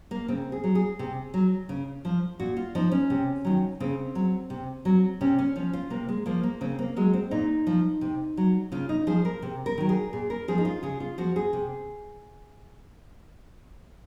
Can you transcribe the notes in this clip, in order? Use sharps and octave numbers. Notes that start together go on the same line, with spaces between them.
A#3
C#3 C4
G#4
F#3
G#4
C3
F#3
C#3
F3
A#2 F#4
F4
F3 D#4
C#4
C3
D#3 F#3
C#3 C4
F#3
C3
F#3
C3 C#4
C#4
F3 C#4
F4
C3 A#3
G#3
F3 A#3
A#3
C#3 C4
A#3
F#3 G#3
C4
A#2 D#4
F3
C3
F#3
C#3 F4
D#4
F3 G#4
A#4
C3
A#4
D#3 F#3
G#4
A#2 G#4
A#4
F3 G#4
D#4
F4
C#3 G#4
F4
F3 F#4
G#4
C3